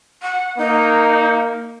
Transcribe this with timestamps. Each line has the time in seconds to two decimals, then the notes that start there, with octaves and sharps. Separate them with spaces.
0.22 F#5
0.58 A#3 D#4